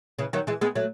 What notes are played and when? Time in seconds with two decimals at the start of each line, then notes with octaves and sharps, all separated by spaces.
0.19 C#3 E3
0.33 D#3 F#3
0.47 E3 G#3
0.61 G#3 B3
0.75 F#3 A3